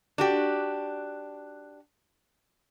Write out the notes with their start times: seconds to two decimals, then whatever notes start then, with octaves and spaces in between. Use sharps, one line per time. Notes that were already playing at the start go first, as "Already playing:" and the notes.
0.18 D4 F#4 G4